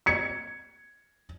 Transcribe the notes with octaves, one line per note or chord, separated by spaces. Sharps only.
G#6 C#7